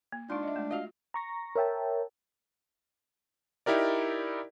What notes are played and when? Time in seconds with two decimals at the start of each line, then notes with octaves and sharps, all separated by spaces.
0.12 A#3
0.30 G#3 D4 D#4 F4
0.43 D#5 E5
0.56 G#3 A3
0.71 F4 F#4 D#5 F5
1.14 A#5 C#6 A#6
1.56 A#4 C#5 E5 G5 A5
3.66 D#4 E4 G4 A#4 D5